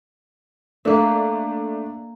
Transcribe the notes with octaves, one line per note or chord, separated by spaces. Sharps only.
A3 A#3 D4 E5